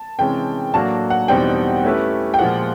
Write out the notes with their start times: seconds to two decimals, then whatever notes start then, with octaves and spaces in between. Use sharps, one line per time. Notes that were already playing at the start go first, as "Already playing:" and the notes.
Already playing: A5
0.19 C3 E3 G#3 C#4 G5
0.74 A2 F#3 A#3 D4 F#4 A5
1.10 F#5
1.28 E2 B2 G3 C4 D#4 G5
1.84 A3 C#4 E4 G4 B4
2.34 G5
2.39 A#2 F3 G#3 F#5